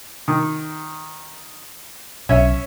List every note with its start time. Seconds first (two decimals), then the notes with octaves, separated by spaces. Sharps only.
0.28 D#3
2.29 B1 C#4 C#5 E5